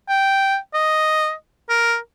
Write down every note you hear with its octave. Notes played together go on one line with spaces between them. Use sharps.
G5
D#5
A#4